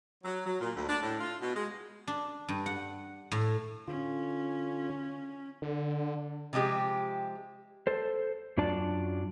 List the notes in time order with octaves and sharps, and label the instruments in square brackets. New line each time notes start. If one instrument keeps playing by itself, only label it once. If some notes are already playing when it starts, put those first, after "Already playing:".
[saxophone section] F#3
F#3
A#2
D2
D4
A2
F4
B2
G#3
[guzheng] D4
G2
F#5
A2
[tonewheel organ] D3 F4 [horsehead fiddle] C#4
[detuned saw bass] D3
[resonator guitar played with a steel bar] C3 F3 G#3 G4
[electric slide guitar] A4 C5
F#2 F#3 D4 F4 D5 A5